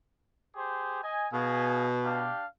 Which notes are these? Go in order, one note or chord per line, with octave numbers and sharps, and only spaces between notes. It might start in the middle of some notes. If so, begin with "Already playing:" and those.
G4 G#4 C5
D#5 G#5
B2 G#4 F5 G#5
D4 G4 F5